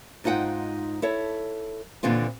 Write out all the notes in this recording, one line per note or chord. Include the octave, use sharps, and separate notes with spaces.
G#2 D#4 F4 F#5 G5
E4 A4 C#5
D#2 A#2 D3 E3 C4 F4